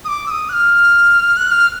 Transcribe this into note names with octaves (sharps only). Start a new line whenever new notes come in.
D#6
D6
E6
D#6
F#6
F6
F#6
F6